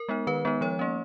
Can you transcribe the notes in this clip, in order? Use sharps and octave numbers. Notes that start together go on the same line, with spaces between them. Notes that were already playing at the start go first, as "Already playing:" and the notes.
Already playing: A#4
G#3 B3 D#4
D#3 B4
G#3 B3 D#4
F3 C#5
A#3 C#4